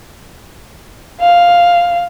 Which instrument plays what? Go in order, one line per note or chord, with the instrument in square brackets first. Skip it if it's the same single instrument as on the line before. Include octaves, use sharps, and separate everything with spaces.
[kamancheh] F5